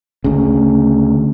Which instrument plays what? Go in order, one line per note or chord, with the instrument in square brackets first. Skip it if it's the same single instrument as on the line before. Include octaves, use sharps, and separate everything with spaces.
[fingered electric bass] D2 C#3